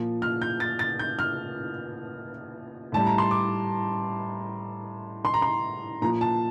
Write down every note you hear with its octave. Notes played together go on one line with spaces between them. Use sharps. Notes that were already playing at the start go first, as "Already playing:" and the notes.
Already playing: A#2 F3
F6
G6
A6
A6
G6
F6
A2 G3 A5
A#5
C6
D6
C6
A#5
C6
A#2 F3 A#5
A5